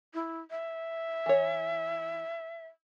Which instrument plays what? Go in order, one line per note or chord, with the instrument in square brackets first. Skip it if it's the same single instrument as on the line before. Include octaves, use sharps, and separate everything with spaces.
[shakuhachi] E4
E5
[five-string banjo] E3 C#5